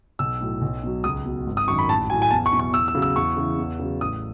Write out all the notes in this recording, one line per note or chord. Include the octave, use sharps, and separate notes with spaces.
B1 E6
A2 F#3
B1
B2 F#3
C#2 D#6
B2 F#3
G#1
D#6
F#2 D#3 C#6
B5
A1 A5
A2 F#3 G#5
G#5
E2 A5
C#6
B2 F#3
C#6
E2 E6
E6
C#3 F#3
E6
E2 C#6
C#3 E3
E2
C#3 F#3
A1 D#6